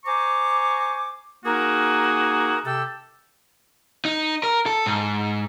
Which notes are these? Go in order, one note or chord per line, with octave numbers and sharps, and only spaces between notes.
C5 G#5 A#5 C#6 D6
A#3 D#4 F#4 G#4 A#4
C3 G4 A4 G5 E6
D#4
A#4
A4
G#2